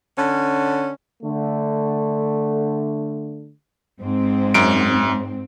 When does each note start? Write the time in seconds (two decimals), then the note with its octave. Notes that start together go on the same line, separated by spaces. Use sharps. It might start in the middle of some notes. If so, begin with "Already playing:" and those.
0.17 D3 C#4
1.23 D3 A3
4.00 G#2 C4
4.54 F#2 D7